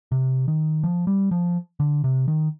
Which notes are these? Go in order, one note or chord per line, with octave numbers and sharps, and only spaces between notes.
C3
D#3
F3
G3
F3
D3
C3
D#3